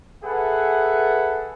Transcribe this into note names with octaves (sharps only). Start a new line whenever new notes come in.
G#4 A4 B4 E5 F#5